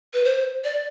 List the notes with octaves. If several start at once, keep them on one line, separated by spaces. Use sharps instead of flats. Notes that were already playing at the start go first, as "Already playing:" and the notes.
B4
C5
D5